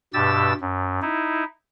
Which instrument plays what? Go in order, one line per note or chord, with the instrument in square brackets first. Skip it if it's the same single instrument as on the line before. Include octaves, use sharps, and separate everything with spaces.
[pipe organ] G2 B2 G4 E6 A6
F#2
D#4 E4